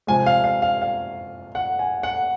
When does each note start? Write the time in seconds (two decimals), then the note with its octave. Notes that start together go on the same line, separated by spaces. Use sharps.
0.07 C3 F3 G#3 G#5
0.26 F5
0.44 F5
0.62 F5
0.82 F5
1.55 F#5
1.79 G#5
2.03 F#5